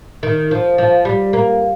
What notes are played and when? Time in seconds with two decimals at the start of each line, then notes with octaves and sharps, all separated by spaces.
0.23 D#3
0.51 F3
0.78 F3
1.05 G3
1.33 A#3